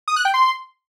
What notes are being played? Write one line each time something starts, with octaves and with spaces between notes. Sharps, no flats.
D#6
F#6
G5
C6